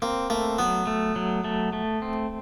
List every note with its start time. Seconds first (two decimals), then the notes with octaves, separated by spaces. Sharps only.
0.02 A#3 C4
0.30 A3 A#3
0.59 F#3 B3
0.87 A3
1.16 F#3
1.44 A3
1.73 A3
2.02 C4